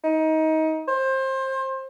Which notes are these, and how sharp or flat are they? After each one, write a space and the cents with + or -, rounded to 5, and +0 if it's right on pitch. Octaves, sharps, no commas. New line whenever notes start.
D#4 +25
C5 +25